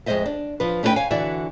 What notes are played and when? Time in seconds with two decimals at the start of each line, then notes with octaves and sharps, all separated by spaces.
0.06 F2 G#3 B4 C5 D#5 E5
0.26 D4
0.60 F3 B4
0.83 A3 C#4 D#4 F4 B4 G5
0.96 C#5 F5 G#5
1.11 D3 E3 E4 F#4 D5 E5